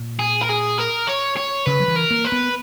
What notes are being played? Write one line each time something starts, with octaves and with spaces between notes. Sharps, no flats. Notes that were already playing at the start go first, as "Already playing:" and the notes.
Already playing: A#2
G#4
A#4
G#4
A#4
C#5
C#5
C#3 B4
F#3
E3
A#4
A#3
B4
B3